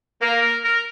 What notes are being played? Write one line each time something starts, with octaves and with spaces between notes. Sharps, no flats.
A#3 A#4
A#4
A#4